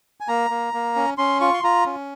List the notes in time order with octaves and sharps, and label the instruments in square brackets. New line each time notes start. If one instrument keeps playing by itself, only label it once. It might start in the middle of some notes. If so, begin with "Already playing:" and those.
[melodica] G#5
A#3 A#5
A#3
A#3
C#4
C#4 C6
F4 C#6
C6
F4 A#5
C#4